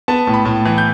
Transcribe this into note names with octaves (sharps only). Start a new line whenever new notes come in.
B3 A5
A2
B5
A2
E3
G6